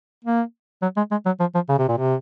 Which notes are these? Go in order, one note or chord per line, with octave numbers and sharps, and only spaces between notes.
A#3
F#3
G#3
G#3
F#3
F3
F3
C#3
C3
A#2
C3